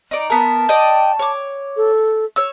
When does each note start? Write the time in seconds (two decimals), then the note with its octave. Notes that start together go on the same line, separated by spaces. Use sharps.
0.11 D#4 D5
0.30 B3 A#4 A5
0.69 D5 D#5 G5
1.19 C#5 D6
1.77 A4
2.36 C#5 E6